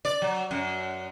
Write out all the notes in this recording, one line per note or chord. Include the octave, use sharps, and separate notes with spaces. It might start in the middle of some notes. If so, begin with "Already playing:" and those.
D5
F#3
F#2